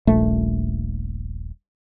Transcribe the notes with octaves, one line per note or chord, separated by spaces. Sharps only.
D#1 A#1 A3